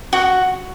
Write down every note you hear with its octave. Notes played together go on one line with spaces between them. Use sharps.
F#4